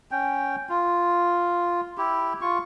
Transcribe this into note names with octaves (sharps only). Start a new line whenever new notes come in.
C#4 G5
F4
E4 G4
F4 C#6